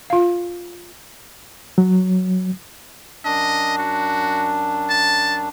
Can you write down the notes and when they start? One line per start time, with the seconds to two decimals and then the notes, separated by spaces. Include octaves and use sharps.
0.10 F4 F5
1.78 F#3
3.25 F#2 D4 D#5
3.79 F#4
4.89 A5